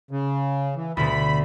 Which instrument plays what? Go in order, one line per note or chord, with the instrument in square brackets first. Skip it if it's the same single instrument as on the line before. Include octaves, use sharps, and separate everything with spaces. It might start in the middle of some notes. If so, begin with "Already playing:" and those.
[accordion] C#3
E3
[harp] D2 B2 [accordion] B5